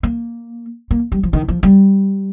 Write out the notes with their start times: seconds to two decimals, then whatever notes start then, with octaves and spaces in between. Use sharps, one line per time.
0.03 A#3
0.91 A#3
1.12 G3
1.23 F3
1.33 D#3
1.48 F3
1.63 G3